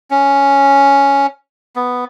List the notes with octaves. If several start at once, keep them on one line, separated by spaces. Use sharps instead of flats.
C#4
B3